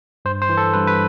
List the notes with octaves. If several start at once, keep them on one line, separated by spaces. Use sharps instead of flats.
G2 C5
C5
E3
A4
G2 B4
B4